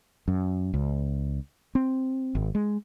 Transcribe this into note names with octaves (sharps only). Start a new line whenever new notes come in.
F#2
C#2
C4
G#1
G#3